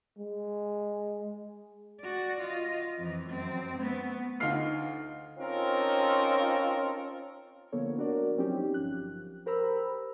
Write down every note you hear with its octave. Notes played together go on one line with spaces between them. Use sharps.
G#3
F#4 D5
F4 D#5
F2 E3
F#2 C4
A3 B3
D2 D#4 F4 F6 C7
C4 C#4 D#4 F4 A4 A#4
D3 F3 A#3 B3 A4 C#5
D4 F#4 A#4 D5
F3 F#3 C4 C#4 D#4 G4
G1 F3 F#6
G4 A#4 C5 A#5 B5 E6